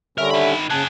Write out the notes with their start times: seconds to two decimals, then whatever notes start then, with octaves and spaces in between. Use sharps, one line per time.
0.18 D3 G3 C#4 A#4 E5
0.31 D#3 B5
0.70 C#3 G#4 F#5 A5